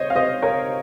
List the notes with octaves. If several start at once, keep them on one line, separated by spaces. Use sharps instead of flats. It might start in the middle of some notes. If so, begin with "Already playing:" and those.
Already playing: C5 C#5 D#5
F5
C5 D#5
A#4 C#5